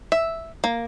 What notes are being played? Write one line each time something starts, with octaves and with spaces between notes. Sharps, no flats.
E5
A#3